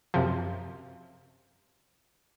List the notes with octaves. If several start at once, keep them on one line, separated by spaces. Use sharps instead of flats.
F#2 C3 F3